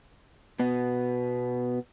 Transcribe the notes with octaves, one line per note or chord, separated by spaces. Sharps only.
B2 B3